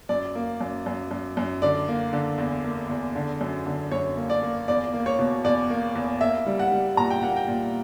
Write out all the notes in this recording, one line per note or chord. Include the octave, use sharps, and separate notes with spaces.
F#2 D5
A#3
F#2
F#2
F#2
F#2
D3 D5
A#3
D3
E2
A#3
E2
D3
F#2
D3
F#2 C#5
A#3
D5
A#3
E2 D5
A#3
C#5
B2
E2 D5
A#3
E2
A#3 E5
G3
F#5
G3
A#2 A#5
G5
A#3 F#5
G5
A#2